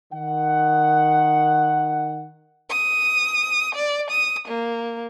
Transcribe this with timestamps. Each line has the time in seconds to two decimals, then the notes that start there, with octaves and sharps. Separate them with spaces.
0.13 D#3 F#5
2.70 D#6
3.75 D5
4.11 D#6
4.48 A#3